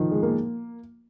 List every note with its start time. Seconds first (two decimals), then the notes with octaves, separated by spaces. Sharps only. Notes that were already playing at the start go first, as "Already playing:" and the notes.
Already playing: D#3 F3
0.11 G#3
0.23 A#3